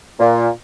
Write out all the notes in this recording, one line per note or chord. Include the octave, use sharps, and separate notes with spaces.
A#2